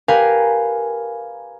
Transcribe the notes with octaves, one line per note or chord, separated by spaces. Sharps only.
G4 A#4 B4 F5 G#5